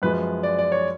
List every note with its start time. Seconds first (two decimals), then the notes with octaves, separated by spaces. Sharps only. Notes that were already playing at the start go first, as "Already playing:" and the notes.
0.02 F#2 F3 G#3 B4
0.43 D5
0.58 D5
0.72 C#5